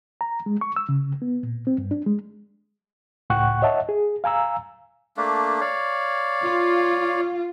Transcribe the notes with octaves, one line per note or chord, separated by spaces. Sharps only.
A#5
G#3
C#6
E6
C#3
B3
A#2
C4
G2
D4
G#3
C#2 A2 F#5 G5 C#6 F#6
C#5 D#5 E5 F#5 A5
G#4
F5 G#5 A#5 E6
A3 A#3 D4
C#5 D5 F5
F4